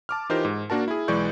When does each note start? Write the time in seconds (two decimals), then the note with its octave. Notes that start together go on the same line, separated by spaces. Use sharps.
0.09 A5 D6 F6
0.30 E3 D#4 F4 G4 A#4 C5
0.45 G#2
0.70 A#3 D4 F#4 A#4 A5
0.88 E4 G#4
1.08 B1 E3 G#3 D5 C#6 G6